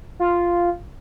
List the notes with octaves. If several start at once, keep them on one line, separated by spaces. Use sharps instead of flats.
F4